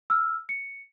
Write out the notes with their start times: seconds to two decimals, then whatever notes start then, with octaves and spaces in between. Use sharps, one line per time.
0.10 E6 F6
0.49 C#7